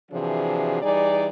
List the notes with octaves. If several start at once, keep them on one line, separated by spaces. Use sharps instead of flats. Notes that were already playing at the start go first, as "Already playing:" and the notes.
C3 E3 F3 D4 F#4 G#4
E3 G3 D#4 G#4 D5